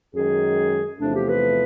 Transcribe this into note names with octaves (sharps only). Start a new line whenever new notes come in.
F#2 D#3 G#3 G#4
E2 C3 F3 A3 D4
G4
B4